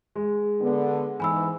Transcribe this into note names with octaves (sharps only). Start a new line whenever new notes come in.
G#3
D3 B3
G#2 E3 G#5 B5 E6